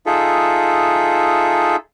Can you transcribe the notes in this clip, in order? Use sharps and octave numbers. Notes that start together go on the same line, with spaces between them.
D#4 F4 G#4 A4 E5